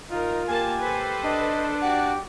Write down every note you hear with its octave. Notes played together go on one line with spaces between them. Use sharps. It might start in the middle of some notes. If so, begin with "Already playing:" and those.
D#4 F4 A#4
A#3 G4 G#5 A5
A4 B4 C5
D4 D#5
F#4 G4 D5 F#5